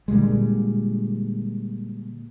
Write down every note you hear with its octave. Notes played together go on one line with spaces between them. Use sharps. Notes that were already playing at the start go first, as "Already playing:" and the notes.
A#2 D3 G3 G#3